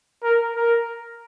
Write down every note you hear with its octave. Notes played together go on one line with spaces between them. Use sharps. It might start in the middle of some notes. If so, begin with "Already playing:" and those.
A#4
A#4